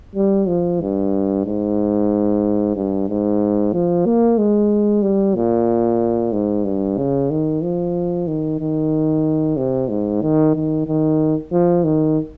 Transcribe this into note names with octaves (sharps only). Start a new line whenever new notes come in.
G3
F3
G2
G#2
G2
G#2
F3
A#3
G#3
G3
A#2
G#2
G2
C#3
D#3
F3
D#3
D#3
C3
G#2
D#3
D#3
D#3
F3
D#3